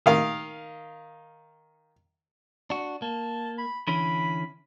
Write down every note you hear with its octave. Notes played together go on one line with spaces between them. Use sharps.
D#3 F5
D4 F#4
A#3 A5
B5
D3 E3 C#4 B5